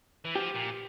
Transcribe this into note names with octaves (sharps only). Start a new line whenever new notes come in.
E3
F3 G4
A#2